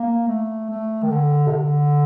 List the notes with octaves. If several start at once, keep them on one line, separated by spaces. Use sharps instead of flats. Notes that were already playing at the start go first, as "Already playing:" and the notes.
Already playing: A#3
A3
A3
D#3
D3
C3
D3